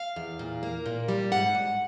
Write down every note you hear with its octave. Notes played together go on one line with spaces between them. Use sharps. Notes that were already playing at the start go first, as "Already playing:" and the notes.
Already playing: F5
E2
A#2
A#3
A#2
G3
G#2 F#5
G#2